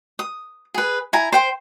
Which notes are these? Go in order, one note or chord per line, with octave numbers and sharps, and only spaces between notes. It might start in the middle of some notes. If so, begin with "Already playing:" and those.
D#6
G#4 B4
E4 G#5 A#5
C5 G5 C6